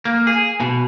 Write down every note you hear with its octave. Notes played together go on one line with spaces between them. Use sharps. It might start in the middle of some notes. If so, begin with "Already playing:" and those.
A#3
G#4
B2